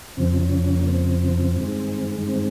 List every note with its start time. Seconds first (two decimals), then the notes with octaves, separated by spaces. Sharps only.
0.17 F2 C#3 F3 C4
0.40 C#4
0.64 C#4
0.76 A#3
0.87 C4
1.57 G2 D#3 G#3
2.26 C4